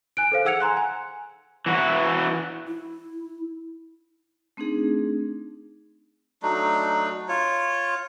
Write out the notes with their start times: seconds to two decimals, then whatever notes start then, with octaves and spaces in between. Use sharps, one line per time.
0.17 G#5 F#6 D7
0.32 A4 C5 F5
0.45 G#4 F#5 E6 G#6 C#7 F7
0.60 G#5 A#5 C6 F#6
0.77 G#5
1.66 E3 F#4
2.67 E4
4.57 A3 C4 D4 D#4 G#4
6.43 F#3 A3 D4 D#4
7.28 F4 C#5